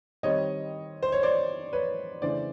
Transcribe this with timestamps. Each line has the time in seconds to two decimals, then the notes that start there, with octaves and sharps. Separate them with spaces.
0.23 D#3 G3 C4 C#5 D#5
1.03 C5
1.12 C#5
1.23 C5 D5
1.73 B4 C#5
2.22 C#3 E3 A3 D4 C5 D5